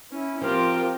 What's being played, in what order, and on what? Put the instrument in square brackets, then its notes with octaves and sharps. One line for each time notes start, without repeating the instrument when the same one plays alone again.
[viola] C#4 [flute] E4
[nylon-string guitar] F3 [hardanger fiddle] C4 G4 [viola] F4 [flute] A#4